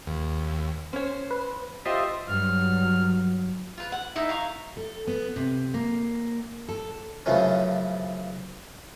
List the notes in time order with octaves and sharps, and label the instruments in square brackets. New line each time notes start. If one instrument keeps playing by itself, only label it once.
[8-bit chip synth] D#2
[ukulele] C#4 C#5 [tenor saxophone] C5
[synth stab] B4
[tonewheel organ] F4 C5 E5 [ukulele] G4 [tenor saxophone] D#5
[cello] G2 [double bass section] F#3 [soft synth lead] F6
[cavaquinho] F4 B4
F#5
D#4 E4 D#5
F5 A#5 C#6
[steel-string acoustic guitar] A4
B3
C3
A#3
A4
[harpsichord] F#2 C#3 E3 F3 A3 C#4